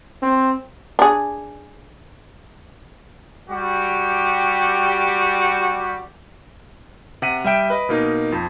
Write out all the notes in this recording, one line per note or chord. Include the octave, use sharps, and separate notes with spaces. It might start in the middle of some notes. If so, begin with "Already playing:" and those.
C4
D4 G#4
G3 F#4 G4
C3 F#5 B6 D#7
G3 E5 G5 D7
B4 D#5
B2 A#3 D#4
F2 F3